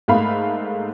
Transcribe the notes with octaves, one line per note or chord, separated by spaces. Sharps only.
G#2 A3 A#3 F5 B5